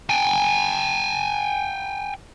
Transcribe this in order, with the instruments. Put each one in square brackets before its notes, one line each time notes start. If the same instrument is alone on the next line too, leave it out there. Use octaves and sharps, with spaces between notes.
[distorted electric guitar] G5 G#5